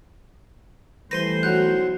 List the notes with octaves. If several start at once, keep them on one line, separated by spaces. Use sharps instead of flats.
E3 G3 A3 B4 C5 C6 A#6 D#7
B1 F#3 F#6 G6